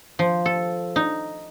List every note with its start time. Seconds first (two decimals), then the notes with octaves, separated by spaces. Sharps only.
0.19 F3
0.45 A4
0.96 D#4